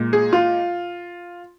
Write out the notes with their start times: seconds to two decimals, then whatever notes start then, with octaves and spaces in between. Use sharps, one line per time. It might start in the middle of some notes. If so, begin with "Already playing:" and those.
Already playing: A#2 G#3
0.13 G#4
0.33 F4